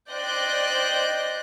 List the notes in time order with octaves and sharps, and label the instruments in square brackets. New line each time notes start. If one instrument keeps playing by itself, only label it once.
[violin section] C5 D5 D#5 G5 F#6 G6